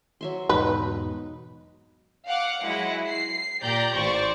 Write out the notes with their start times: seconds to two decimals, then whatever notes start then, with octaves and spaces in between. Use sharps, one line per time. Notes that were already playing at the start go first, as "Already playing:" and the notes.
0.21 F#3 E5 C6
0.49 E2 G#2 B2 D#4 B4
2.27 F5 F#5 D6
2.62 F#3 G#3 E4 F#5
3.09 C7
3.62 A#2 G4 D5 A#5 G6
3.95 A1 C5 D5 C#6